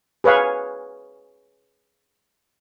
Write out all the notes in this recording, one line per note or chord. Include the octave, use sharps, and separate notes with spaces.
G#4 B4 C#5 F5 G#5